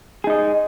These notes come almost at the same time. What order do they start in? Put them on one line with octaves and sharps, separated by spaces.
G#4 D#4 D#5